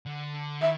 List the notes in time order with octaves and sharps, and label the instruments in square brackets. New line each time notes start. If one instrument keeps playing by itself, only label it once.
[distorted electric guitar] D3
[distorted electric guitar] D#3 [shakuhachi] E5